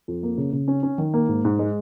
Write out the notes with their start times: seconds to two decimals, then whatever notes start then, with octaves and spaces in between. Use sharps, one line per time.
0.08 F2
0.23 A#3
0.38 C#3
0.53 C#3
0.68 C#4
0.83 C#4
0.98 D#3
1.14 A#3
1.29 G#2
1.45 G#2
1.59 G#3